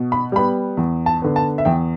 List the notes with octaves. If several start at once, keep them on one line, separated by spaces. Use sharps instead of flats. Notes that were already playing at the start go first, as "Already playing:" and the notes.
Already playing: B2
B5
G3 B3 B5
E2
A5
D3 B3
A5
E5
E2 G5